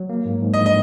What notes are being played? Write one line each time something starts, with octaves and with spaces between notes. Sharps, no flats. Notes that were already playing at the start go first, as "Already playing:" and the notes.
Already playing: F#3
A#3
G#2
G#2
D#5
F3
D#5